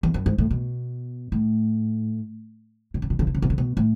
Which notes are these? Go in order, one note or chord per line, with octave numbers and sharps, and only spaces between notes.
E2
F#2
G#2
A2
B2
A2
B2
C#3
B2
C#3
B2
C#3
B2
C#3
B2
A2